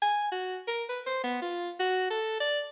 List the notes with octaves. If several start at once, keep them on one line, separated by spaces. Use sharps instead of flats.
G#5
F#4
A#4
B4
C5
B3
F4
F#4
A4
D5